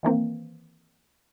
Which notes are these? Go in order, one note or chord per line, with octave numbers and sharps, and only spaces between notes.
D#3 E3 A#3 C4